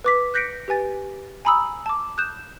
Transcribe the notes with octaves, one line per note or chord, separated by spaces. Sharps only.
B4 D6 B6
F#6 G6 A#6 B6 C#7 D7
G4 B4 G#5 A6
G#5 A#5 B5 D#6 E6
A5 D6
D#6 F#6 G6 E7